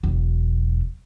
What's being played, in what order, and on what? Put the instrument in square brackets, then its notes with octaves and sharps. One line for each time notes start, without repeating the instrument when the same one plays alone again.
[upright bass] E1 F#3